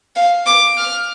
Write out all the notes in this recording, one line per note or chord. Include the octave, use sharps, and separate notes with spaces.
F5
D6
F6